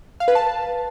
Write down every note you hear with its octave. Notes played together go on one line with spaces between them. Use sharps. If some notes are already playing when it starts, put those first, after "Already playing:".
F5
B4
A5